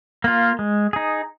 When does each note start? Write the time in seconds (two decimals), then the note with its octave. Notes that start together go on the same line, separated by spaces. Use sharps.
0.24 A#3 F4
0.59 G#3
0.93 D#4 G#4